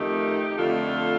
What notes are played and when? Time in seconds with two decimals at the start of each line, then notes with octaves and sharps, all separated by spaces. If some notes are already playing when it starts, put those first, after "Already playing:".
Already playing: F2 D#3 A3 D#4 G4
0.57 F2 D3 A3 F4 A4